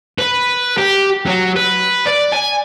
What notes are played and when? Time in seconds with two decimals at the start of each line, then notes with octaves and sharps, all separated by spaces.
0.18 B4
0.78 G4
1.26 F#3
1.56 B4
2.07 D5
2.33 G#5